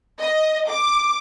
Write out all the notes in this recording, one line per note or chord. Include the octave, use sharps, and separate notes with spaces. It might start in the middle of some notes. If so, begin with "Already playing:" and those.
D#5
D6